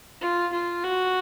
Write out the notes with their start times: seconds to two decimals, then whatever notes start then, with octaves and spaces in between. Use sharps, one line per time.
0.21 F4
0.52 F4
0.83 F#4